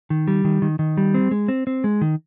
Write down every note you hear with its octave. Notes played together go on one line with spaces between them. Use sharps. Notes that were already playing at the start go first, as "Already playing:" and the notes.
D#3
G3
D#3
D#3
D#3
G3
C4
G#3
C4
C4
G#3
D#3